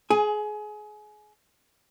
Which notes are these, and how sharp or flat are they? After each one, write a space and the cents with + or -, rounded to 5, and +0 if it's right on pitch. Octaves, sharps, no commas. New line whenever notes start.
G#4 +25 G#5 +0